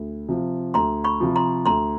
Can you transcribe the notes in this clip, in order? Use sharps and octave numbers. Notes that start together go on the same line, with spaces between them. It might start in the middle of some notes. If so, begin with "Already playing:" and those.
Already playing: D2
C3 F3
D2 A#5 C6
B5 C#6
C3 F3
A#5 C6
D2 A#5 C6